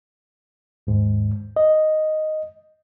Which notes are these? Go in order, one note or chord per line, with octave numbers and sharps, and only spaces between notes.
D#2 G#2
D#5